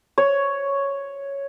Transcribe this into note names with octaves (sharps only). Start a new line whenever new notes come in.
C#5